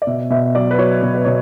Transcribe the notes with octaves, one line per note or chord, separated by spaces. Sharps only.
D5
B2 E5
B2 E5
F#3 D5
B4
F#3 C#5
B2
B4
B2 C#5